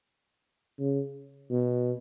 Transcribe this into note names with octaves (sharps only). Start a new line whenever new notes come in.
C#3
B2